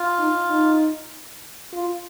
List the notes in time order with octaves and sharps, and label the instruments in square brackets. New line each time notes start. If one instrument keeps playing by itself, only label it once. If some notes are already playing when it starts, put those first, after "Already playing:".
Already playing: [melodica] F4
[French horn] D#4
D#4
F4